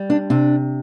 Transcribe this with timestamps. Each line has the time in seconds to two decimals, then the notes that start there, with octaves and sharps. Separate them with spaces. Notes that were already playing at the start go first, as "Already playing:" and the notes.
Already playing: G3
0.10 D4
0.30 C3 D4